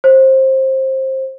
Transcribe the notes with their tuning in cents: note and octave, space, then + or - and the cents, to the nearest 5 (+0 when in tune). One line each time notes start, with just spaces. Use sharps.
C5 +20